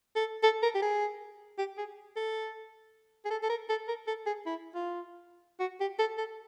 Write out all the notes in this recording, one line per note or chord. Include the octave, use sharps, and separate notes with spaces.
A4
A4
A#4
G4
G#4
G4
G#4
A4
G#4
A4
A4
A#4
A4
A#4
A4
G#4
E4
F4
F#4
G4
A4
A4